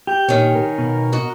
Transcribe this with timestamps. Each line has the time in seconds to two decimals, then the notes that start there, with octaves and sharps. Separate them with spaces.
0.07 G4 G6
0.29 A#2 D#3 C#4
0.55 A#4
0.78 B2
1.12 F#4 D#5